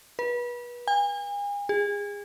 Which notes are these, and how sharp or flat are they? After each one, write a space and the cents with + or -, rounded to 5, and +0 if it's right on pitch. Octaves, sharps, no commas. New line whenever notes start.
B4 -30
G#5 -40
G#4 -25